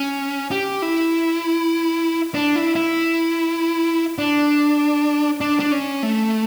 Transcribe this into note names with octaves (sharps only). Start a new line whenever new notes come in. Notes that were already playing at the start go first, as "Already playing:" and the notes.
Already playing: C#4
G4
E4
D4
E4
E4
D4
D4
D4
C#4
A3